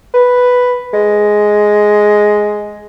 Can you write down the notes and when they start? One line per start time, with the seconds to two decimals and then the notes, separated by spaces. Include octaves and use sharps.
0.14 B4
0.93 G#3